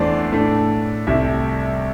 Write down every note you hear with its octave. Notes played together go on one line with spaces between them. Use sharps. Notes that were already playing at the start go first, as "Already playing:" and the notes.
Already playing: E2 E3 A3 D4 C5 D5
A2 A3 D4
C2 C3 A3 E5